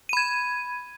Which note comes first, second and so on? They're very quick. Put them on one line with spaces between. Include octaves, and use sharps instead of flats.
D#7 B5 G#6